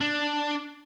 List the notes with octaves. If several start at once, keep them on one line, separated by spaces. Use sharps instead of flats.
D4